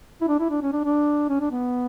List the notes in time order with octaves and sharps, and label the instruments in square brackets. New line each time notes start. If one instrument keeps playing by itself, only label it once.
[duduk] E4
D4
E4
D4
C#4
D4
D4
C#4
D4
B3